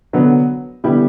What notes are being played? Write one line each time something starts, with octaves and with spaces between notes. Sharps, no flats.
D3 F#3 B3
D3 G3 B3 E4 G4